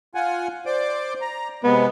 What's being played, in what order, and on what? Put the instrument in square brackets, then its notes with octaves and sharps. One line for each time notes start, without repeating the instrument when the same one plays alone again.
[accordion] F4 F#5 G#5
C5 D5 D6
A#5
[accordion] C3 G#3 [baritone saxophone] B3